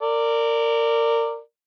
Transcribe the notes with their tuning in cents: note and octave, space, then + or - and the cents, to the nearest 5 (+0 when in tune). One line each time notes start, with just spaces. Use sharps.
A#4 -20 D5 +0